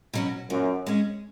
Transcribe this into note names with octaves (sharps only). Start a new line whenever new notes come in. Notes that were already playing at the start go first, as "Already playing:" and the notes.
B2 F#3 C#4
F#2 A#2
G#3 C#4